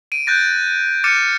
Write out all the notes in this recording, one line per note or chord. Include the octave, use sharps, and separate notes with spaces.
D7 D#7
F#6 G6 A6 A#6 D7
D6 F6 A6 C#7 D#7 E7